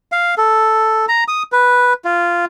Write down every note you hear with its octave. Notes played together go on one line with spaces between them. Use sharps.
F5
A4
A#5
D#6
B4
F4